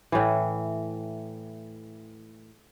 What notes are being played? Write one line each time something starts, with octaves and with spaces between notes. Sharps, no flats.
A2 E3